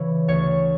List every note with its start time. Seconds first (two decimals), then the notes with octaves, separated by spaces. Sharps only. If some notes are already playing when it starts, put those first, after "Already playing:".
Already playing: C#3 E3 C#5
0.28 D2 C#5